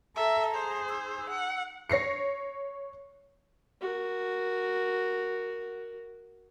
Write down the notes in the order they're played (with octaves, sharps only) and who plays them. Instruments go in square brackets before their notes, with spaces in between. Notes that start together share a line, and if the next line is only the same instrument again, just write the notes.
[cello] A4 [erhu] E5 [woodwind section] A#5
[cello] G#4 [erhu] C5
[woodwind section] D#4 A#5 E6
[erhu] F#5
[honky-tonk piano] C#5 A#6 C7 C#7
[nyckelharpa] F#4 A#4